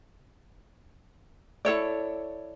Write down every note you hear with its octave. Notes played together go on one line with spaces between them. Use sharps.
E4 A4 C#5 D5